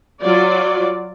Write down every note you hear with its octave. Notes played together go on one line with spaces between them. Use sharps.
F#3 F4 D5